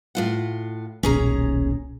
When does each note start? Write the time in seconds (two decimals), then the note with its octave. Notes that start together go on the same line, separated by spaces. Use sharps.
0.15 A2 F4 F#5
1.03 D#1 B1 C#4 G#4 A#5